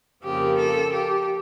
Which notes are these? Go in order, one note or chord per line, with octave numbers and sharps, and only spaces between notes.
F2 C#3 F3 A#3 G4
A4
G4